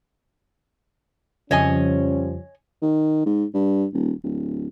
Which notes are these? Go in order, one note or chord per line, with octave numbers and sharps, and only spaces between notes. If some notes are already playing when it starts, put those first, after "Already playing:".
F2 C#3 F3 G3 C#4 C#5 D#5 G#5
D#3
G#2
G2
D#1
D1